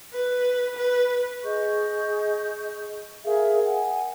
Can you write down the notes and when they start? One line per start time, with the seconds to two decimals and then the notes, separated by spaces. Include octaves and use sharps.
0.13 B4
0.76 B4
1.44 G#4 D#5 C#6 G6
3.25 G#4 A#4 E5 F5
3.65 F#5 G#5